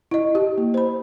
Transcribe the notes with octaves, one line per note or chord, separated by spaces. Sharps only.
E4 D#5
G4
A#3
C5 B5